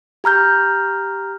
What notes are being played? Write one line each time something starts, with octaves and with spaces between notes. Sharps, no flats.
G4 A#5 F6 G6